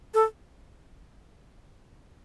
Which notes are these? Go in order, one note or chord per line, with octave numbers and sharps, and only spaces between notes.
A4